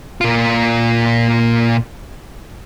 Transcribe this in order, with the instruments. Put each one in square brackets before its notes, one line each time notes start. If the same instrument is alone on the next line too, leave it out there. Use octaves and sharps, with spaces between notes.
[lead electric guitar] A#2 F4